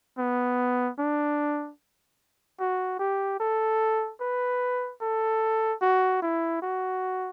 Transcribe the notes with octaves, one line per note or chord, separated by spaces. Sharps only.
B3
D4
F#4
G4
A4
B4
A4
F#4
E4
F#4